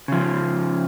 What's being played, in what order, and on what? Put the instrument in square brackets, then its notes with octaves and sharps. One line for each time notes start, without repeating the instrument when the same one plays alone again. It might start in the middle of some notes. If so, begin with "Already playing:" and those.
[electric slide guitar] C#3 F3